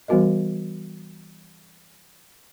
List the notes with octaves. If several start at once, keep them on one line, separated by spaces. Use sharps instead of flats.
E3 G3 B3 F#4 A#4 D#5